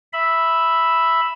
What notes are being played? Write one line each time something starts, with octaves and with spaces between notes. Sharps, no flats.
E5 B5